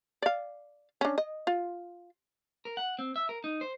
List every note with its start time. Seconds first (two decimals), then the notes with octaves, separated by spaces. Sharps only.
0.22 D5 F5
1.01 C#4 D4
1.18 D#5
1.47 F4
2.65 A#4
2.77 F#5
2.99 C4
3.16 E5
3.29 A#4
3.44 D#4
3.61 C5